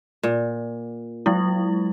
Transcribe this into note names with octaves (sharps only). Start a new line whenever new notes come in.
A#2
F#3 G#3 E4